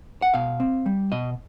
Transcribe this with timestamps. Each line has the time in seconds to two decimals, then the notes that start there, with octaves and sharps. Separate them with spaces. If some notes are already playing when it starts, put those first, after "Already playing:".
0.22 F#5
0.34 B2 F5
0.60 C4
0.86 G3
1.12 B2 D#5